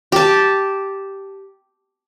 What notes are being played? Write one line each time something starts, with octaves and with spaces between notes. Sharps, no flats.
G4 A5